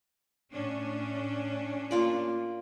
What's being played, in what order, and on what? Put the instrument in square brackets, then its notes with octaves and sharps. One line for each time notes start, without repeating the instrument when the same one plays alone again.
[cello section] A2 C#4 D4
[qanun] A#3 F4 D5